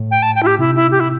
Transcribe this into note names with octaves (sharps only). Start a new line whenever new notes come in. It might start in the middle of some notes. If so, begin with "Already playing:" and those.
Already playing: A2
G5
A5
G5
E4
G4
C3 E4
E4
G4
E4